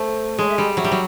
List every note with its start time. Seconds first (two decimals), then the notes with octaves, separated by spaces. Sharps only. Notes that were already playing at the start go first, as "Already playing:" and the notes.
Already playing: A3 C5
0.38 G#3 C#5
0.49 E5
0.58 G3 D#5
0.73 F5
0.77 F#3 E5
0.84 G3
0.92 F#3